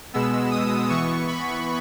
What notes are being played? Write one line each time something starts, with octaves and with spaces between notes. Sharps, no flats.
B2 G#3 B3 E6
D#6
E3 B3 C#6
B5